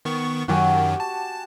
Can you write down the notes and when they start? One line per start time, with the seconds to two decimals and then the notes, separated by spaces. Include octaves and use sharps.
0.05 D#3 B3 C#6
0.48 F#2 D#3 F#3 F#4 G4 G#5
1.00 A5